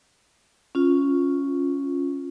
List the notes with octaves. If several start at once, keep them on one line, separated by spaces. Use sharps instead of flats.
C#4 F4